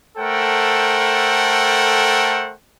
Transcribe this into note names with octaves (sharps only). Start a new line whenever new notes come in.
A3 A4 A#4 C5 F#5 G5